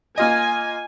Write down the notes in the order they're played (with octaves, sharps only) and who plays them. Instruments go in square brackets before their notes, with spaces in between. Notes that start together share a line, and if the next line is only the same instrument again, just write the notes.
[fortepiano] A#3 F4 D#5 [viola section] G#5